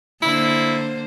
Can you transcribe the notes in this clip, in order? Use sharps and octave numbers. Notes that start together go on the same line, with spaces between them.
D3 A#3 E4 C5